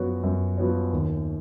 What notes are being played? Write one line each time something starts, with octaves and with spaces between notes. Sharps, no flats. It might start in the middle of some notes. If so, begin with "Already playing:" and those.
Already playing: F#2 F3 B3 F#4 C#5
F#2
F3 B3 F#4 C#5
D#2